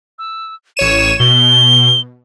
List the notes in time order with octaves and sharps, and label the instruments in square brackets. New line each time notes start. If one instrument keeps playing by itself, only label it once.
[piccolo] E6
[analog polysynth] A1 C#5 E7 [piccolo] D#7
[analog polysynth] B2 [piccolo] G7